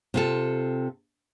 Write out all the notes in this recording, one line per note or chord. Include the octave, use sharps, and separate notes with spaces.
C3 F4 A4